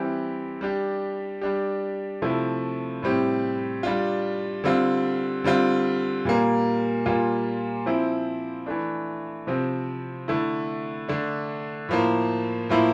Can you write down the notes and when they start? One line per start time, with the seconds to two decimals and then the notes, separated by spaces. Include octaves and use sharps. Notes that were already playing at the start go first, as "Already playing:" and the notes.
Already playing: E3 G3 C4 E4 G4
0.61 G3 D4 G4
1.41 G3 D4 G4
2.22 C3 F3 A3 E4
3.03 A2 G3 C4 G4
3.83 G3 D4 F4
4.64 D3 G3 C4 F4
5.44 D3 G3 C4 F4
6.25 A#2 G3 A#3
7.06 A#2 G3 A#3 F4
7.86 F3 C4 E4
8.66 E3 A3 D4
9.47 C3 F3 C4
10.28 D3 A3 E4
11.08 D3 A3 D4
11.89 A2 F3 A#3
12.69 A2 F3 A#3 E4